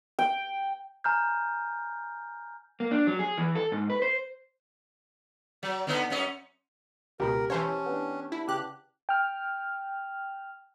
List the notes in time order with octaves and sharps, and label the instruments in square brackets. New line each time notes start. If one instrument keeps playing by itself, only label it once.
[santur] G5
[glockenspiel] G#5 A#5 F6 G6
[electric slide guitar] A#3
D4
F#3
G#4
E3
A4
G#2
B4
C5
[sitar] F#3
D3 B3 D#4
F#2 C#4 D#5
[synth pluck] C#2 B2 [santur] G4 B5 [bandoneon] A#4
[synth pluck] E3 C5 C#5 [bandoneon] C#4 [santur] A5 C#6 E6
[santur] B3 D4
[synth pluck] E4
[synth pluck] C#3 F#6 [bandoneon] G4
[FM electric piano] G5 F6